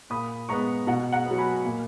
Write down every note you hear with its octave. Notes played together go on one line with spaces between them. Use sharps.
A#2 B5 D#6
G#3 B3 A#5 C#6
B2 F#5 A#5
F#5 A#5
B3
F#3
G#5 B5
A#2